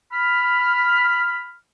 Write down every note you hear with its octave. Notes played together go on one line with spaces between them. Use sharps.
B5 F6